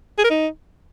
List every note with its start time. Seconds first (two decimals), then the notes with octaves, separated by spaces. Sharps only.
0.18 G#4
0.24 A#4
0.30 D#4